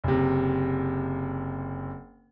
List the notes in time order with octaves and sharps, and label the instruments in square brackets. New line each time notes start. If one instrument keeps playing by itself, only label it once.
[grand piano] F#1 C3